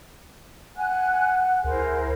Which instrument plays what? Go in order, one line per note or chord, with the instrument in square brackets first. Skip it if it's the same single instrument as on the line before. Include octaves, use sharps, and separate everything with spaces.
[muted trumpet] F#5 [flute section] G#5 F#6
[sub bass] D2 [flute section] E4 A#4 C5 [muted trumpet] G#4